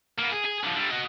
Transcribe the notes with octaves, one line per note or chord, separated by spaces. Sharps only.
A#3 B3
G#4
G#4
D3 F3
D3 G3
F#4 D#5